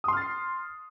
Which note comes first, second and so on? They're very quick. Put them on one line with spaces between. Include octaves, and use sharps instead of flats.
D#6 C6 F6 A6 C7